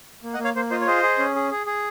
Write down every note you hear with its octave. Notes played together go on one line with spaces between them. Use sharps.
A#3
D#5 F#5
A#3
C#5 F5
A#3 C5
F4 C5 D#5
C#5
G#4 C5 D#5
G#4
C#4
G#4
G#4
G#4